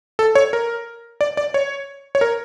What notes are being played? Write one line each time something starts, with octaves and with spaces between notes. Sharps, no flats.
A4
C#5
A#4
D5
D5
C#5
C#5
A#4